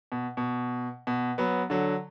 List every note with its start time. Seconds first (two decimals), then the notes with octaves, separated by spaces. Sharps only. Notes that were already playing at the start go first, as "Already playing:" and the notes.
0.12 B2
0.37 B2
1.07 B2
1.38 F#3 B3
1.70 D3 F#3